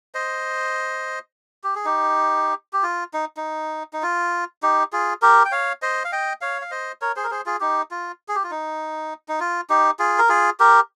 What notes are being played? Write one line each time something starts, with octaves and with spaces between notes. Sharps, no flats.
C5 D#5
G4
G#4
D#4 G4
G4
F4
D#4
D#4
D#4
F4
D#4 G4
F4 G#4
G4 A#4
G5
C#5 F5
C5 D#5
F5
D#5 G5
C#5 F5
F5
C5 D#5
A#4 C#5
G#4 C5
A#4
G#4 C5
F4 G#4
D#4 G4
F4
G#4
G4
F4
D#4
D#4
F4
D#4 G4
F4 G#4
A#4
F4 G#4
G4 A#4